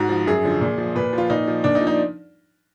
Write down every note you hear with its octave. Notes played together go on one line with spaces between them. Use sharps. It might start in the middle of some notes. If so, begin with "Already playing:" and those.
Already playing: G#2 F#4
F3
F#2 G#4
D3 F3
A#2
F3
A#2 B4
F3
F4
A#2 D#4
F3
A#2 D4
D#4
F3
D#4